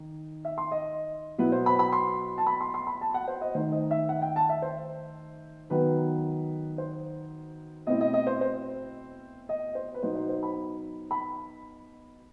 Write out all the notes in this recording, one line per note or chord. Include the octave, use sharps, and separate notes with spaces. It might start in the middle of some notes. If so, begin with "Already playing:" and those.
Already playing: D#3 D#4
E5
C6
D#5
B2 F#3 B3 E4 B4
C5
B5
B5
C6
A5
B5
C6
C6
B5
A5
F#5
C5
D#5
D#3 A3 D#4 C5
D#5
E5
F#5
G5
A5
E5
C5
D#3 F#3 B3 B4
C5
B2 A3 C4 E4 D#5
D#5
D#5
C5
C5
D#5
C5
B4
B2 F#3 B3 D#4 C5
C5
C5
B5
B5